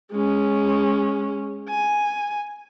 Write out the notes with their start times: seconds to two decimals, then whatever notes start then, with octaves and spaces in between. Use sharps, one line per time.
0.12 G#3 C#4
1.69 G#5